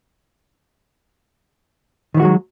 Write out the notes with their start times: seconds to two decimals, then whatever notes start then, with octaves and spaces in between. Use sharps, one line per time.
2.14 D#3
2.17 E3
2.20 F#4
2.22 G#3
2.25 F#3